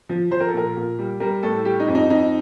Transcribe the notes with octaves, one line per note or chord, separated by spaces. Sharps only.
F3
F3 C5
A#4
A4
A#2 A#4
A#2
G3
G3 A#4
A2 A4
G3 G4
D#4
F2
D#4
F2 D#4